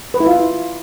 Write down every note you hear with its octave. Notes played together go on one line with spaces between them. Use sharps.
B4
E4
F4